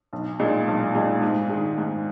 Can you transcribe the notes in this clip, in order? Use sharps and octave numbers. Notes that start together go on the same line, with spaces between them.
B1
A#2 G#3 D#4
B1
A#2 G#3 D#4
G#2
D#3 G#3
G#2